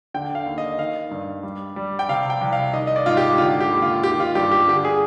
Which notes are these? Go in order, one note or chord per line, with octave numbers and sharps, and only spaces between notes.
D3 G5
F5
D#2
D#5
D#3 F5
G2
G3
G3
G5
C3 F5
G5
C2
F5
D#3 D#5
D#5
D5
G#2 F4
G4
D3 F4
G4
D#2
F4
D#3 G4
F4
G2 G4
G4
D3 G4
G#4